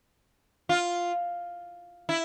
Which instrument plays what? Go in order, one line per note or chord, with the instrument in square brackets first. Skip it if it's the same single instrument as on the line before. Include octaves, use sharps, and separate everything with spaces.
[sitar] F4
E4